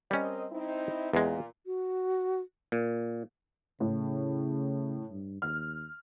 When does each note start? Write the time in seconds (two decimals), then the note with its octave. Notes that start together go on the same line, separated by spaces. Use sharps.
0.11 G3 C4 C#4 A#4 D#5
0.52 C4 D#4 E4
1.13 E2 A#2 G#3
1.66 F#4
2.72 A#2
3.80 A2 C#3
5.10 G2
5.42 D#2 F6